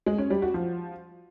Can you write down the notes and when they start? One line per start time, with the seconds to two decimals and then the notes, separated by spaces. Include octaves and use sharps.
0.06 G#3
0.18 C#4
0.30 G3
0.42 F#4
0.54 F3